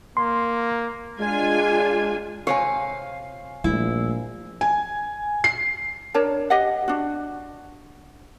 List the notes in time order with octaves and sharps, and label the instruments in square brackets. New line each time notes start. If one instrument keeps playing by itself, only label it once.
[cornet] A#3 [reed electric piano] C6
[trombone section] G#3 [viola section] D4 F4 G#5
[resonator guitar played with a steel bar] C3 C#5 [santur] F5 G#5
[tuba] A#1 [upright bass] G3 A3 [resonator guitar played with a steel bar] E4
[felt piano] G#5
C7
[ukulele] D4 A#4 C#5 A5
G4 D#5 F#5
D4 F#4